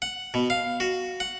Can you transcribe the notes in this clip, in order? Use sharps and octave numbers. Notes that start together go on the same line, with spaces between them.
F#5
B2
F5
F#4
F#5